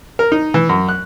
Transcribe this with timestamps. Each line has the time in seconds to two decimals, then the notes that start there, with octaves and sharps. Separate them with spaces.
0.19 A#4
0.32 D#4
0.54 E3
0.69 F#2
0.89 F#6